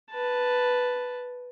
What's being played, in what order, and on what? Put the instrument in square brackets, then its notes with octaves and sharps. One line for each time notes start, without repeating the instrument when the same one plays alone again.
[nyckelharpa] B4 A5